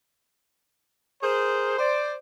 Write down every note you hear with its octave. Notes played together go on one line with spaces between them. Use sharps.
G#4 A#4 C5
C5 D5